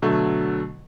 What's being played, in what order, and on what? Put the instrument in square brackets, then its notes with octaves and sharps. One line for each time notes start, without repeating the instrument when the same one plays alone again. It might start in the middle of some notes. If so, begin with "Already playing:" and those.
[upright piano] B2 D3 F#3 A3